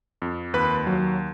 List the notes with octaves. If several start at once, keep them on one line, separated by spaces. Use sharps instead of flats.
F2
D#2 B4 B5
F#3